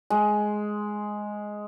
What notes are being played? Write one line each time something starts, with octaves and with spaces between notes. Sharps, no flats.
G#3